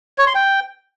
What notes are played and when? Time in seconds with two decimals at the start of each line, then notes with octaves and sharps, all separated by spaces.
0.18 C#5
0.27 C6
0.35 G5